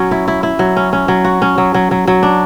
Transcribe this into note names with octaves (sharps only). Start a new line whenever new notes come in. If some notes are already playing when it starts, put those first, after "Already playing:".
Already playing: F#3 C#4
E4
E4
E4
F#3
C#4
C#4
F#3
F#4
C#4
F#3
F#3
F#3
F#3
D4